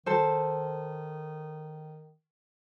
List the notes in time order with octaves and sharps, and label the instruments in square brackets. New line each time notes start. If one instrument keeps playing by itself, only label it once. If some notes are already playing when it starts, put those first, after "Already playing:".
[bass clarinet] D#3 [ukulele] A4 C5